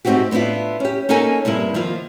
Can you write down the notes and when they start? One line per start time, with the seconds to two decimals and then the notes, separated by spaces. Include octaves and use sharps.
0.05 G#2 A3 C4 D#4 F#4 G4
0.31 A2 B3 D4 E4 F4
0.80 C#4 G4
1.09 A#3 C#4 D#4 A4 A#4 G#5
1.45 G2 C3 A#3 E4
1.74 D#3 F3 A#3 F4